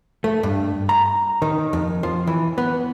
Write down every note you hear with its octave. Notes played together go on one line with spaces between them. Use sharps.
A3
G2
A#5
D#3
F2
F3
E3
B3